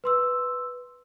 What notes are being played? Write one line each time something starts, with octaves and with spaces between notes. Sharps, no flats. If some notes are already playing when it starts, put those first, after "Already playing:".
B4 C6 E6